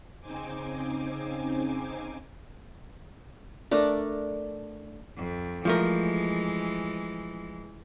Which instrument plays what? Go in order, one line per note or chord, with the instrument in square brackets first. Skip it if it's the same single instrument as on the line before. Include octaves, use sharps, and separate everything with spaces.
[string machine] C#3 C4 D#4 C5 G#5 D6
[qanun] A3 D4 A#4
[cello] F2
[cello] E3 G#3 [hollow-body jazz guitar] F3 A3 A#4